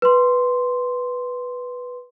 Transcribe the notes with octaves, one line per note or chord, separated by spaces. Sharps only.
B4 C6